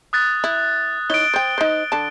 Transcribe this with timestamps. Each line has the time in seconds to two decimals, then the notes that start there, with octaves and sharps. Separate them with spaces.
0.13 D#6 F#6 A6
0.44 E4
1.10 D#4 E4 C#5 D7 G7
1.34 C5 G5 D7
1.58 D#4 C5
1.92 D3 A5